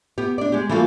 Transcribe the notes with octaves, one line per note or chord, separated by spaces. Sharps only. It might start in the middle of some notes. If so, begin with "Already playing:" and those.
B3 G4
D4 D5
G#3 G4
E3 G3 A#3 F4 F#4 A4